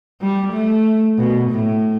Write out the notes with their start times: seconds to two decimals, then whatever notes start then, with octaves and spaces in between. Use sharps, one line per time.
0.21 G3
0.53 A3
1.18 B2
1.50 A2